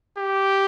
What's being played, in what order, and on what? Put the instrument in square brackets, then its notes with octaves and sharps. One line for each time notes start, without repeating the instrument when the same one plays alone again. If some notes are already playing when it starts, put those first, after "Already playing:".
[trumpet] G4